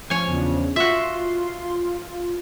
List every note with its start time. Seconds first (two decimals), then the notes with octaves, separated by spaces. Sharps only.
0.10 F3 C#4 C#5 G#5
0.27 E2 C#3 D4
0.76 F4 F#4 E5 C6